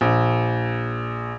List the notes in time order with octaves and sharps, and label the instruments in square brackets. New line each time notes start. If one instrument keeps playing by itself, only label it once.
[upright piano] A#1